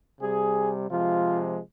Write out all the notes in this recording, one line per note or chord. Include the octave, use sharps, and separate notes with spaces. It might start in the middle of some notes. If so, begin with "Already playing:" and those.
C3 G3 G#4
C3 F3 G#3 F4